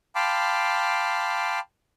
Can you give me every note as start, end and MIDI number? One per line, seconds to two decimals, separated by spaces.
0.15 1.59 77
0.15 1.59 79
0.15 1.59 81
0.15 1.59 83
0.15 1.59 84
0.15 1.59 86